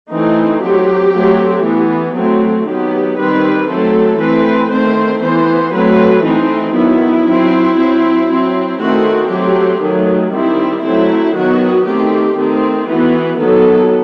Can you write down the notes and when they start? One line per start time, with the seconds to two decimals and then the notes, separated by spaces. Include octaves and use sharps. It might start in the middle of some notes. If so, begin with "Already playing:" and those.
0.11 E3 A3 C4 D#4
0.62 F#3 C4 G4
1.14 F#3 A3 C4
1.64 E3 B3
2.15 F#3 A3 C4
2.67 D#3 F#3 B3 G4
3.18 D#3 G3 C4 B4
3.68 F#3 A3 C4 A4
4.20 E3 A3 C4 B4
4.70 D#3 A3 C4 C5
5.22 E3 B3 C5
5.72 F#3 A3 C4 B4
6.23 E3 A3 C4 D#4
6.74 D#3 F#3 B3 E4
7.26 F#3 C4
7.78 F#3 C4
8.28 F#3 C4
8.79 D#3 A3 C4 F#4
9.30 F#3 A3 C4 G4
9.81 D#3 F#3 A3
10.32 D#3 G3 C4 E4
10.83 F#3 A3 C4 E4
11.34 D#3 F#3 B3 F#4
11.85 D#3 A3 C4 G4
12.37 D#3 A3 C4
12.87 E3 B3 F#4
13.39 D#3 F#3 B3 A4